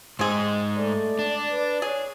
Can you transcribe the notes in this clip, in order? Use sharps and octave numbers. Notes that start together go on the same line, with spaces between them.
G#2 G#3 C4 D#4 G#4
A3 D5
D4
B4
G#4 C#5